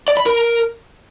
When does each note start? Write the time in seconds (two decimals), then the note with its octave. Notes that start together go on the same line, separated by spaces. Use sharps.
0.08 D5
0.17 B5
0.26 A#4